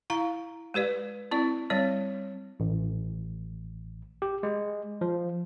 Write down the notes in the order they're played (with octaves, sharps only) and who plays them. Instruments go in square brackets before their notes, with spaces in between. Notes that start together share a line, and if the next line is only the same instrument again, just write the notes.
[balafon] E4 F5 A#5
G#3 G4 B4 D5
C4 E4 D5
G3 C4 C#5 D5
[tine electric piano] A1
G4
G#3
F3